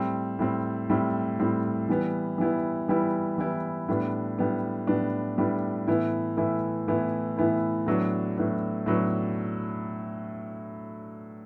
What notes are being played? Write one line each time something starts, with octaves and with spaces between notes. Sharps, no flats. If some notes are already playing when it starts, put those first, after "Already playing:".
Already playing: A2 G3 C4
A2 G3 C4
A2 G3 C4
A2 G3 C4
E3 G3 B3 E4
E3 G3 B3 E4
E3 G3 B3 E4
E3 G3 B3 E4
A2 G3 B3 D4
A2 G3 B3 D4
A2 G3 B3 D4
A2 G3 B3 D4
A2 E3 B3 E4
A2 E3 B3 E4
A2 E3 B3 E4
A2 E3 B3 E4
A2 F#3 B3 D4
A2 F#3 B3 D4
A2 F#3 B3 D4